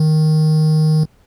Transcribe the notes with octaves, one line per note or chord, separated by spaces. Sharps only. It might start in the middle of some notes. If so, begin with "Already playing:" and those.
Already playing: D#3